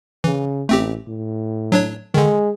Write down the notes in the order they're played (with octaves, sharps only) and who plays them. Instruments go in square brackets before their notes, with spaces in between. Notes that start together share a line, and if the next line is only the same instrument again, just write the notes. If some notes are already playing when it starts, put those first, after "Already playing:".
[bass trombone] C#3 [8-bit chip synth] E3
[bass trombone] A1 [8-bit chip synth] A3 C4 G4
[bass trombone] A2
[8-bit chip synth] F#3 D4 C#5
[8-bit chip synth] D3 D#3 [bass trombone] G#3